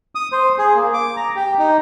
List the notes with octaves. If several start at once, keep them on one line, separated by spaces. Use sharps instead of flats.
D#6
C5
G#4
A#3
D6
A#5
G4
D#4